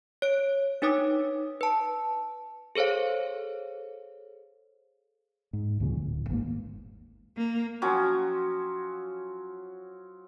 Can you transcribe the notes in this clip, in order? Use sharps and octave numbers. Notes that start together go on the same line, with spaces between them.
C#5 D7
D4 D#4 B4 C#5 D6 D#6
B4 A5
G#4 A4 C5 C#5 F5
G#2
D2 A#2 C#3 F3
D1
G1 D#2 G#2 A#3
A#3
F3 F#3 C#4